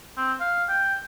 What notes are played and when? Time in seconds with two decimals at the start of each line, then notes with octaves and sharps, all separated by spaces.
0.17 C4
0.40 F5
0.69 G5